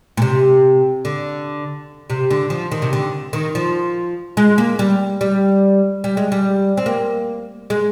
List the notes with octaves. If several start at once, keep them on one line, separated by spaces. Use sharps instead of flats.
A#2
C3
D3
C3
D3
F3
D#3
C3
D3
D#3
F3
G#3
A#3
G3
G3
G3
G#3
G3
C4
A#3
G#3